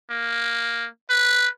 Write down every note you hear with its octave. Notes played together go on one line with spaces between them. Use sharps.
A#3
B4